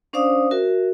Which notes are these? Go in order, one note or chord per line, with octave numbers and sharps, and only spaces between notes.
C#4 D4 C5 D5 F5 D#6
F#4 A#4 E5